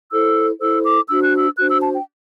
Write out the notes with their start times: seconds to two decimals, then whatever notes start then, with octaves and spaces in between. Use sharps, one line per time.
0.12 E4 A4 C5 E6
0.60 E4 A4 C5 E6
0.84 D6
1.09 D4 F#4 C5 E6
1.22 F#6
1.36 E6
1.58 D4 F#4 C5 F#6
1.70 E6
1.82 A5
1.94 G5